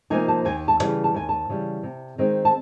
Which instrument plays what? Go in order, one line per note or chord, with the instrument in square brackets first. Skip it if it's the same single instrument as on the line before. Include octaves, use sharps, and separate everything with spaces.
[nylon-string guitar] C3 F3 A#3 D#4 G#5
A5
D#2 G#5
A5
C#3 E3 G3
A5
D#2 G#5
A5
C#3 E3 G3
C3
D#3 G#3 C4 D#4
A5